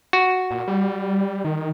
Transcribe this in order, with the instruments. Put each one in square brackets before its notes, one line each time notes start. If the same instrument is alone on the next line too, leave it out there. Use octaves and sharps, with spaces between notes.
[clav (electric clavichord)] F#4
[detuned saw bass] A#2
G3
D#3